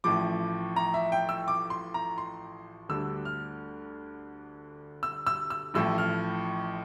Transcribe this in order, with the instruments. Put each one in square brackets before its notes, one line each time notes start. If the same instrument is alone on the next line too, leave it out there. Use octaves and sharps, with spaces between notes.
[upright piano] A1 A2 F3 D6
A#5
E5
G5
E6
D6
C6
A#5
C6
D2 D3 G3 D4 E6
F6
E6
E6
E6
A1 A2 F3 E6
F6